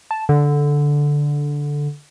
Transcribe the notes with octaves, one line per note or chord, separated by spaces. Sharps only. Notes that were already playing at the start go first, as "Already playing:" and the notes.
A5
D3